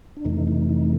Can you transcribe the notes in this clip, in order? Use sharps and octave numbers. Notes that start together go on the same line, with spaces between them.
D4
F2 C3 E3 A3 D#4
D#4
D#4